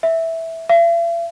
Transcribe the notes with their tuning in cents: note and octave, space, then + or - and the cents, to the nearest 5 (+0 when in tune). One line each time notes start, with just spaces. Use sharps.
E5 -5
E5 +45